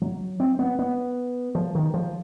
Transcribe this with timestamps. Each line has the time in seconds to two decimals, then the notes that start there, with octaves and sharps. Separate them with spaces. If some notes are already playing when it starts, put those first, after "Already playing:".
0.02 F#3
0.40 C4
0.59 B3
0.79 B3
1.55 F3
1.75 D#3
1.94 F3